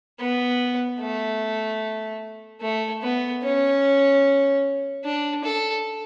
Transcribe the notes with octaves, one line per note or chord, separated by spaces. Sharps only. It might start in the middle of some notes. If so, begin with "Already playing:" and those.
B3
A3
A3
B3
C#4
D4
A4